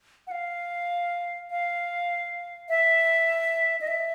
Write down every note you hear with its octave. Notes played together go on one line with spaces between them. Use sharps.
F#5
F5
F5
E5
D#5
E5